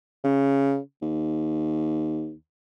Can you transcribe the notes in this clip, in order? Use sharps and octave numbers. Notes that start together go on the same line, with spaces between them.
C#3
D#2